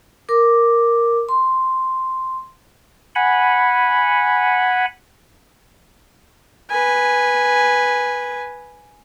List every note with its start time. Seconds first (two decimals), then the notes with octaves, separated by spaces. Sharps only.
0.29 A#4 D6
1.29 C6
3.15 F#5 G#5 B5
6.70 B4 G#5